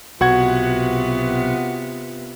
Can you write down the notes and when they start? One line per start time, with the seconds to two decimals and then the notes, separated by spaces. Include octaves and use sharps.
0.21 B1 C3 B3 F4 F#4 F#5 G#6